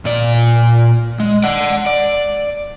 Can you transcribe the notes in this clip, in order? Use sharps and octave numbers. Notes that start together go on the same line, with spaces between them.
A#2 D5
G#3
D5 F#5
D5